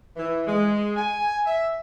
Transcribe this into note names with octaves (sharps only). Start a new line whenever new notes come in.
E3
G#3
G#5
E5